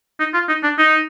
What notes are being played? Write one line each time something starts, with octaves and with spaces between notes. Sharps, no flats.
D#4
F4
D#4
D4
D#4